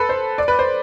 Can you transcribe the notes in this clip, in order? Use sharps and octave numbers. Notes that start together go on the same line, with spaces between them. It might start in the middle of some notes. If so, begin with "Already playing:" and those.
Already playing: A4 B4
C5
D5
B4
C5